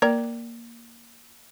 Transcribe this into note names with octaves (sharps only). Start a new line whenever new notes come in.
A#3 A#4 D5